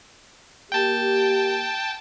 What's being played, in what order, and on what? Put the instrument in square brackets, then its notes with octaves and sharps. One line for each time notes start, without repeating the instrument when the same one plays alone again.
[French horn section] A#3 G4 [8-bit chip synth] G5 A5